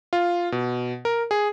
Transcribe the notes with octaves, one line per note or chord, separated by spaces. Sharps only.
F4
B2
A#4
G#4